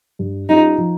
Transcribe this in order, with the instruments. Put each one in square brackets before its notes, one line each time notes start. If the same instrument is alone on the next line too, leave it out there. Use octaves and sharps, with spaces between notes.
[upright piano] G2
[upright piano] G3 C#4 F4 [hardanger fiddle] D#4
[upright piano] F3